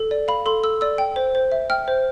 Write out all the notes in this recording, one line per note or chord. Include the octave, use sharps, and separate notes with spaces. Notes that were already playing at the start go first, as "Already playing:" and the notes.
Already playing: A4
D5
F5 B5
A4 C6
A4 E6
D5 E6
G5
C5
C5
E5
G5 F6
C5